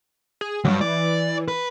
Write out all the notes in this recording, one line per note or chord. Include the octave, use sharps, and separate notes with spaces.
G#4
D2 G2 F#3
E3 D5
B4